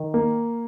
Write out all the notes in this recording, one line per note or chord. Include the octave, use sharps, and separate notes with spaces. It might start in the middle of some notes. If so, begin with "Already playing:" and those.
Already playing: D#3
A#3